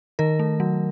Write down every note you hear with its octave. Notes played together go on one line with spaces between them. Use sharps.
D#3 A#4
A3
F#3